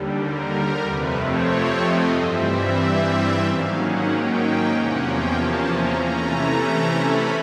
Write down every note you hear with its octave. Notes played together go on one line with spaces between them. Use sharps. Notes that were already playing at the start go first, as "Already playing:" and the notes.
Already playing: D#2 D3 G3
A#4
F2 C3 F3 A3 C4 B4
C#5
D#5
G2 E3 G3 C4 E5
E5
G#2 D#3 F#3 A#3 C#4 F5
F#5
G5
E2 C3 F3 A#3 C#4 F#5
G5
A5
A#5
C3 E3 A3 C#4 A#5
B5